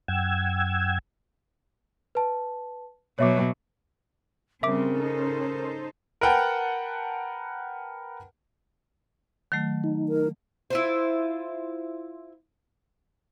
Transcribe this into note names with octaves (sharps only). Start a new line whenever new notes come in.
F#2 F#5 G5 E6 G#6
B4 A5
B2 F#3 C#5 E5 D6
C#3 G3 C4 C#4 A#4 E5 D6
D#4 A4 C5
A#4 B4 F#5 G5 A5
D#3 F#3 A3
D#4
A#4
E4 F4 C5